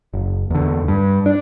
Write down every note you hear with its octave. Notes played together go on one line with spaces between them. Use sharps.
F#1
E2 D3
G2
D4